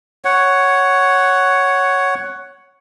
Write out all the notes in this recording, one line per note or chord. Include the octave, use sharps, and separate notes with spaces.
C#5 F#5